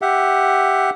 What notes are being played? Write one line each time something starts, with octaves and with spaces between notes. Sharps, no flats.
G4 E5 F#5